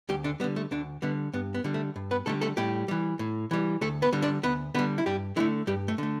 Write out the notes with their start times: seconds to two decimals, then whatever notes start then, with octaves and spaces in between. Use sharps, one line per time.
0.09 D2 G3 G4
0.24 D3 D4
0.40 G3 B3
0.44 D3
0.56 A3
0.71 D2 D3 D4
1.02 D3 G3 B3
1.33 G2 B3
1.54 B3
1.64 D3 G3
1.74 A3
1.96 G2
2.11 B3 B4
2.26 D3 G3 A3 A4
2.41 A3 A4
2.57 A2 G3 G4
2.88 E3 G3
3.19 A2
3.51 E3 G3
3.81 D2 A3 A4
4.02 B3 B4
4.13 D3 G3
4.22 D4 D5
4.43 D2 B3 B4
4.75 D3 G3 B3 B4
4.98 E4
5.06 G2 G3 G4
5.36 D3 E3 A3 E4
5.67 G2 G3 G4
5.88 A3
5.98 D3 A3